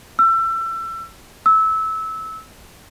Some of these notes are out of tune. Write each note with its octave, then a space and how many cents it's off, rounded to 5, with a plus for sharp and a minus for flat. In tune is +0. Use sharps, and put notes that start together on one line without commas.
E6 +30
E6 -20